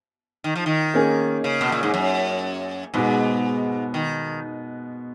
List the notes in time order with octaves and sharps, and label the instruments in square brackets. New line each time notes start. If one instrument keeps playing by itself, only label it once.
[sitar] D#3
F3
D#3
[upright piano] A#3 C#4 G#4
[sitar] C#3
B2
A#2
G#2
F#2
[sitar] G#2 [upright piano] B2 G#3 B3
[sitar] D#3